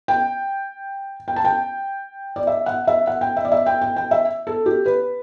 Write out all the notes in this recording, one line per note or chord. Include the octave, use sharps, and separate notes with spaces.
G5
G5
A5
G5
D5
E5
F#5
E5
F#5
G5
E5
D5
E5
G5
G5
G5
E5
A4
G4
B4